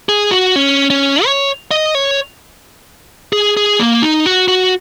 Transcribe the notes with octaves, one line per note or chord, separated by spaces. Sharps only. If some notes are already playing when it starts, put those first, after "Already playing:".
G#4
F#4
C#4
C#4
C#5
D#5
C#5
G#4
G#4
A#3
D#4
F#4
F#4